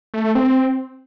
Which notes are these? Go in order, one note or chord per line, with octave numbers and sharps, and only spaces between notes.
A3
A3
C4